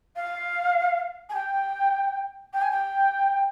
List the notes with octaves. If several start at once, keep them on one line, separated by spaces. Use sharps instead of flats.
F5
G#5
G5
G5
G#5
G5